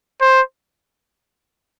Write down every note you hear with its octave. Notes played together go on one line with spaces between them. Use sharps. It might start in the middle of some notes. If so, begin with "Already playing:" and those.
C5